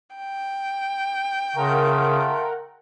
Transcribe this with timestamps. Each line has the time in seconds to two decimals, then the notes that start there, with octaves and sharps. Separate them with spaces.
0.16 G5
1.56 C#3 A3 F4 A#4 F#5